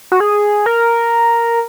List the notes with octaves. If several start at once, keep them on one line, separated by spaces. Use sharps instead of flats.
F#4
G#4
A#4